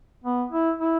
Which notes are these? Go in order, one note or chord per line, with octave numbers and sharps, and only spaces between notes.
B3
E4
E4